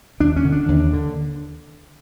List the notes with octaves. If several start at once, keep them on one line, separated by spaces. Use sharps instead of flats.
D#2 D4
C#4
D3
D4
D#2
D3